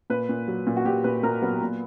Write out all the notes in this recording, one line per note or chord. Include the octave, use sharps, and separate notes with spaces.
A#2 B4
A#2
F#3
A#2
F#4
A#2 G4
A#2 B4
A#2 A#4
F#3 B3
A#2